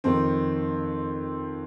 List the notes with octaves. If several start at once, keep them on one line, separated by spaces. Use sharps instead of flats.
F2 D#3 C4